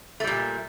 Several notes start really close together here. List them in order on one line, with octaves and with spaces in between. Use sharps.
A3 G3 A#2